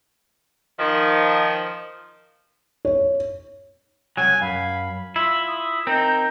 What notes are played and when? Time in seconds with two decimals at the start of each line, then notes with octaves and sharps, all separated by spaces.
0.79 D#3 F3
2.85 C#5
4.17 C2 F#3 G#5 G#6
4.41 F#2 F5 B5
5.16 E4 F4 E6
5.48 D#6
5.87 C4 D#4 A#4 G6